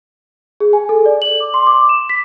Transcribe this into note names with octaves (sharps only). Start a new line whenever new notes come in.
G#4
G#5
A4
D5
F#7
D6
C6
D6
E7
B6